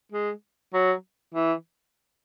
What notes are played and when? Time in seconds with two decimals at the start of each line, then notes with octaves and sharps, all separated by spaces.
0.12 G#3
0.74 F#3
1.34 E3